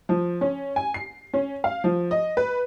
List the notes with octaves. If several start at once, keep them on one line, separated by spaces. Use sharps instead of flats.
F3
C#4
G#5
C7
C#4
F5
F3
D#5
B4